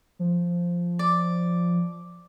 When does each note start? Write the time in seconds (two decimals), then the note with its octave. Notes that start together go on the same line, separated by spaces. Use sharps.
0.19 F3
0.99 D5